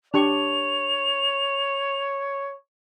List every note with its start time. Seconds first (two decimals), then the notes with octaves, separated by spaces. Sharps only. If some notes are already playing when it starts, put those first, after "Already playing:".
0.14 D4 G4 C#5 C#6 F7